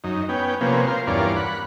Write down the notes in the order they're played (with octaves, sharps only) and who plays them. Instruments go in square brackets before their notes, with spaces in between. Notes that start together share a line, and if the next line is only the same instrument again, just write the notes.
[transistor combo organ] F#2 D#4
B3 C#4 G5
C3 F3 A#3 B3 C#4
F4 A#4 C5
E2 G2 C#4 F4 A#4 D5
F#5 B5